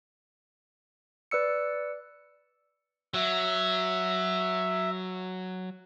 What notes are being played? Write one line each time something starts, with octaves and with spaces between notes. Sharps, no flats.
B4 D5 E6 C#7
F#3 E5